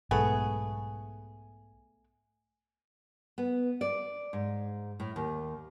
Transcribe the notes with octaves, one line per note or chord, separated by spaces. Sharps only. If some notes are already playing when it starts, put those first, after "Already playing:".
B1 G#2 A3 B3 G#4
B3
D5
G#2
A2
D#2